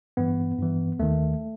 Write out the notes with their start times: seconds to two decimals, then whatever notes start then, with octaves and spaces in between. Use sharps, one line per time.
0.17 G2 E3 B3
0.59 G2 E3
0.99 D#2 D#3 A3